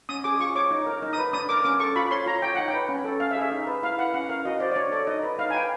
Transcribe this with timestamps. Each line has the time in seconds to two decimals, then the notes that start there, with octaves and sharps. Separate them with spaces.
0.09 C#4 D#6
0.24 G#4 D6
0.40 F4 C#6
0.55 C#5 D6
0.71 D#4
0.87 A#4
1.02 D#4
1.13 B4 D#6
1.33 D4 D#6
1.49 A#4 D6
1.64 C#4 D6
1.80 A4 C#6
1.96 F4 B5
2.11 C#5 C6
2.26 F4 A#5
2.42 C#5 G5
2.55 D#4 F#5
2.68 G5
2.73 B4
2.89 C#4
3.04 A4
3.20 C#4 F5
3.31 E5
3.36 G#4
3.41 E5
3.52 D#4
3.67 B4
3.82 E4 F5
3.99 B4 F#5
4.14 C#4 F#5
4.29 A#4 F5
4.45 F#4 D#5
4.60 C5 D5
4.72 D5
4.76 D4 C#5
4.92 A4 D5
5.07 D#4 D#5
5.23 B4
5.39 D#4 F5
5.50 G#5
5.54 B4 G5